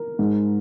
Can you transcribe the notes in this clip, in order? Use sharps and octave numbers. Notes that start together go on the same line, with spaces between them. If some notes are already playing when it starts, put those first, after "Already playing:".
Already playing: A#4
G#2